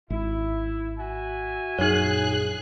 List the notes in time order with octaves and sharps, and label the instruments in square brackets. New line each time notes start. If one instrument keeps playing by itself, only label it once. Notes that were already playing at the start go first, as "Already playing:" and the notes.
[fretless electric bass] G#1 [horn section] E4
[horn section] F#4 E5 G#5
[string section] A#1 G#4 F#6 [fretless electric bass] F#2 [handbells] D#4 C#5